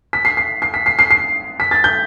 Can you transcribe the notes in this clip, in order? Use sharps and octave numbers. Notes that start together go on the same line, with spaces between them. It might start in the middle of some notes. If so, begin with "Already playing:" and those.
B6
C7
C7
C7
B6
C7
C7
C7
B6
A6
G6